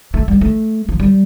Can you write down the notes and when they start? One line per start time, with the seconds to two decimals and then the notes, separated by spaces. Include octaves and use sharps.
0.14 A3
0.28 G3
0.41 A3
0.89 F3
1.00 G3